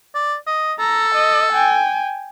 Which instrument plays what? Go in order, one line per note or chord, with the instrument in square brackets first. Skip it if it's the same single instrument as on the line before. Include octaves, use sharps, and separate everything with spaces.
[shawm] D5
D#5
[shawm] A4 [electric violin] A#5
[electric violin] D#5
G5 G#5